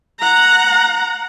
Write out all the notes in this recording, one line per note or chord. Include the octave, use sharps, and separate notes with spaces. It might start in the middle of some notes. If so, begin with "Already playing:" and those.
F#5 A#5